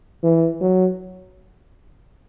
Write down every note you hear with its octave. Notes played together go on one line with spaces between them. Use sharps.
E3
F#3